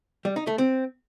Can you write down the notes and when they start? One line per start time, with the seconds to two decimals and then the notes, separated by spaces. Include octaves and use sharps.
0.25 G3
0.36 D#4
0.47 A3
0.58 C4